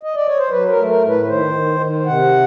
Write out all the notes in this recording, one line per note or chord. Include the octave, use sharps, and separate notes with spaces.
D#5
D5
C#5
C5
F#3 B4
A#4
A3
A#4
A2
B4
D#3 C5
D#3
D#3
C3 F#5